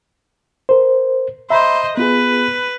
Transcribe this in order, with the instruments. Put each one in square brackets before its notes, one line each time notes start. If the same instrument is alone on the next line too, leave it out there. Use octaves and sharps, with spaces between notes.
[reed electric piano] A#4 C5
[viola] C5 D#5 [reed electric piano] E5 A#5 B5
[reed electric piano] B3 F4 G#4 [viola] B4